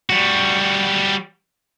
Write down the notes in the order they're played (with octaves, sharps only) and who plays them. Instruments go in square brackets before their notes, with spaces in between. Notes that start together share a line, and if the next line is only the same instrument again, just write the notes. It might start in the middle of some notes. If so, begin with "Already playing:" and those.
[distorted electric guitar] G3 F#4